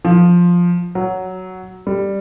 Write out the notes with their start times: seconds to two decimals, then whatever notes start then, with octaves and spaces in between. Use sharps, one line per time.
0.05 F3
0.95 F#3
1.87 G3